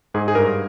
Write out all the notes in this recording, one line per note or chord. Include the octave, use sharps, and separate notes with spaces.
G#2 G#4
G#4
G2 A#4